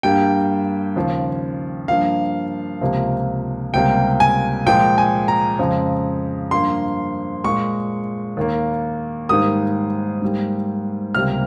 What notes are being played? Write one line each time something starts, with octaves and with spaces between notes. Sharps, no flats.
G2 G3 A#3 G5
D#2 C#3 F3
G2 F3 A#3 F5
C#2 C3 F3 A#3
C#2 C3 G3 A#3 G5
G#5
A#2 F3 G#3 G5
G#5
A#5
F2 C#3 F3 G#3
G2 F3 A#3 C6
A#2 G#3 C#6
D#2 D#3 A#3
G#2 D#3 G3 A#3 D#6
G#2 G3 A#3
C#2 C3 G3 A#3 F6